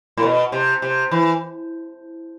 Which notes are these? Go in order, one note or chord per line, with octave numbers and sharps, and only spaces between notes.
A2
B2
C3
C3
E3